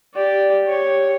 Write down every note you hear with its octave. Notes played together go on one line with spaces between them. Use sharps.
G4 D5
G4 C#5